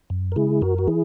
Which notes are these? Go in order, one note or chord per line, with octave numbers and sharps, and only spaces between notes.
F#2
A#4
C#3 G#3 E4 G#4
F#2 F#4 A#4
F#4
E3 E4 G#4